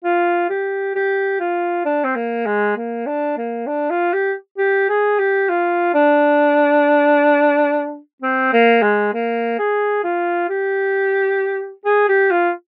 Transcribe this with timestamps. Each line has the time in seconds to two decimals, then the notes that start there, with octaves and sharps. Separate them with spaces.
0.04 F4
0.49 G4
0.95 G4
1.40 F4
1.85 D4
2.04 C4
2.16 A#3
2.46 G#3
2.77 A#3
3.06 D4
3.37 A#3
3.67 D4
3.90 F4
4.13 G4
4.58 G4
4.89 G#4
5.19 G4
5.49 F4
5.94 D4
8.22 C4
8.53 A#3
8.82 G#3
9.13 A#3
9.59 G#4
10.04 F4
10.49 G4
11.85 G#4
12.08 G4
12.31 F4